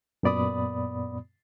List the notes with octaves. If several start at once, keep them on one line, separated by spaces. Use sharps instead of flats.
F#2 A#2 B3 D5 B5 D#6